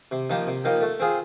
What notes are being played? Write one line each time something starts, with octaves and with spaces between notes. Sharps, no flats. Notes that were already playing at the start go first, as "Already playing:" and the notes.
C3
F3 A#3 D#4 G4
C3
F3 A#3 D#4 G4
A3
C4 F4 G#4